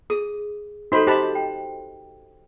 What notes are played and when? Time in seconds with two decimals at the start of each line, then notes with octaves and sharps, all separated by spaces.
0.10 G#4 D#6
0.92 D#4 F#4 A4 C5 B5
1.07 G4 C5 D#5 A5 B5
1.35 G5